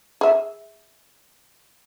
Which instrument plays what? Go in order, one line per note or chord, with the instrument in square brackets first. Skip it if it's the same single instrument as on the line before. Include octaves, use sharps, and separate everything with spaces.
[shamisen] G#4 E5